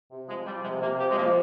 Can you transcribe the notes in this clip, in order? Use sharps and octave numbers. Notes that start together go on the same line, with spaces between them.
C3
F3 G#3
F3 G3
C3 G#3
C3 A#3
F3 G4
G#3
F3 A#3